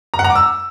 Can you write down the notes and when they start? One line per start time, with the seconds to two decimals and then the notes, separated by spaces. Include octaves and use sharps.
0.14 A#5
0.19 F#5
0.24 A#5
0.30 D6
0.35 E6